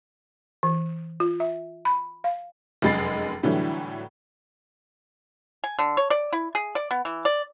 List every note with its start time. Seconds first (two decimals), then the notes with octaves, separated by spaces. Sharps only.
0.63 E3
1.20 F4
1.40 E5
1.85 B5
2.24 F5
2.82 F1 F#2 G#3 B5 A6 C7
3.43 A2 D3 E3 F#3 G3 A3
5.64 G#5
5.79 D3
5.97 C#5
6.10 D5
6.33 E4
6.55 G#4
6.75 D5
6.91 B3
7.05 E3
7.25 D5